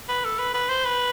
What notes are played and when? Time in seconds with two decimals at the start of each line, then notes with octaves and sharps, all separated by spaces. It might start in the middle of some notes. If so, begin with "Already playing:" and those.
0.09 B4
0.25 A4
0.39 B4
0.54 B4
0.69 C5
0.85 B4